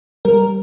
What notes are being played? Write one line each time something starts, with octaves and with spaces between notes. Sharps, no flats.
G3 A#4